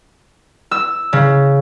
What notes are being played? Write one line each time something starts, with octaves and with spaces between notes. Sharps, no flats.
E6
C#3